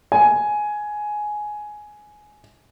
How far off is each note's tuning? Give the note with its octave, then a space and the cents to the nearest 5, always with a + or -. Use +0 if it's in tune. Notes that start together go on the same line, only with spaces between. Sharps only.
G#5 +10